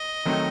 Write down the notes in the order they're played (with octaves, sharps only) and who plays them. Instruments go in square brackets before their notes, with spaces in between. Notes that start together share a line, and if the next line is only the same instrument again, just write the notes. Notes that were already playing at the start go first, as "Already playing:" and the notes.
Already playing: [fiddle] D#5
[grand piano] D#3 F#3 A3 C4 D#4